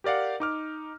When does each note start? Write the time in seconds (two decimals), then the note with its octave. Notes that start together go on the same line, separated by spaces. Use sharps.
0.04 G4 A#4 D5 F5 F#5
0.40 D#4 D6 F6